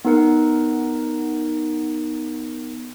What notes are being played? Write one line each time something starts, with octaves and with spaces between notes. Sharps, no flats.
B3 D#4 A#4 F#5